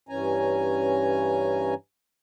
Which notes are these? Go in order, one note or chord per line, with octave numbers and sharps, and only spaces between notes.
G2 E3 C#4 G#5 A#5